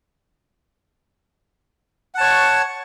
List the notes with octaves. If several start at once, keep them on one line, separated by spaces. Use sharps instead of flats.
C#5 F#5 A5 C#6